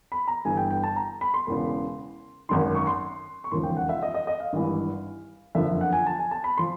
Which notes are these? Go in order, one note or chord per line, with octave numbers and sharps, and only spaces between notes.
B5
A#5
G1 G2 E3 G#5
G5
G5
A5
A#5
B5
C6
E1 E2 C#3
G#1 F#2 D#3 C6
C#6
C6
C#6
E1 D#2 C#3 F3 C6
G5
F#5
E5
D#5
D#5
D#5
F5
G#1 G2 E3
F#1 F2 D3 F3 E5
F#5
G#5
A5
G#5
A5
B5
F3 C6